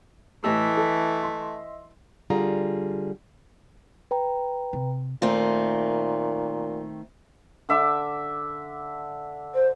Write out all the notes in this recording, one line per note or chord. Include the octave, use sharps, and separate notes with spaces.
A2 E3 A3 G4 D#5 E5 E6
A4
C6
D3 G3 F4 G#4 A#5
B4 G5 A#5
C3
A#2 D#3 A3 C4
D3 E5 D6
C5